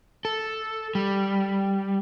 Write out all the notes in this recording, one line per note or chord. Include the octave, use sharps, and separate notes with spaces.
A4
G3